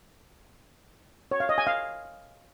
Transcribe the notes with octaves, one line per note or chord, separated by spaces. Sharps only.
C#5
F5
D#5
G#5
F5